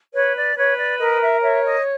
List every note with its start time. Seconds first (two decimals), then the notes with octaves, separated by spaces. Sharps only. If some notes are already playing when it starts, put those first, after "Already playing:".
0.14 B4 C#5
0.35 D5
0.56 B4 C#5
0.77 D5
0.99 A#4 D#5
1.20 E5
1.41 C#5 E5
1.63 D#5